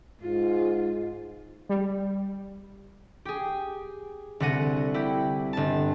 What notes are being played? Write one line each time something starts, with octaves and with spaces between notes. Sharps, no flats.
G#2 F4
G3
G4 G#4
C2 D3 F#5 A#6 D#7
E4 G4
G1 A5